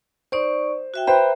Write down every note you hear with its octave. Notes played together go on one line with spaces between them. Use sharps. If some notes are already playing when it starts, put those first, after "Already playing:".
D#4 C5 D5 C#6
F#4 E5 G5
B4 C5 E5 G5 A#5 B5